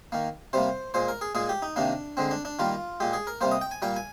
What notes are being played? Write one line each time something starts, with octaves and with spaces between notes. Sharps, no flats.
D#3 A#3
C3 G3 A#3 C5
A#2 G#3 C5
A#4
G#4
A#2 G#3 G#4
G4
D#4
C3 D#3 A#3 D4
D3 G#3 C4
D4
D4
D#3 G3 A#3 F4
A#2 G#3 G4
G#4
A#4
C3 G3 A#3 C5
D#5
G5
G#5
A#2 G3 A#3 G5
G#5